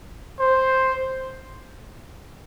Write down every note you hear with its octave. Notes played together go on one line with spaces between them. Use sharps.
C5